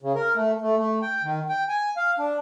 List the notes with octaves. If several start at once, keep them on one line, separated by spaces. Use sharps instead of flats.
C#3
A#4
A3
A3
A3
G5
D#3
G5
G#5
F5
D4